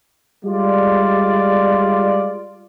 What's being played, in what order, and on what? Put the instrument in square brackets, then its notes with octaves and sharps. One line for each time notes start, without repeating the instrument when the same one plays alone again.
[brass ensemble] G3 G#3 F4 D5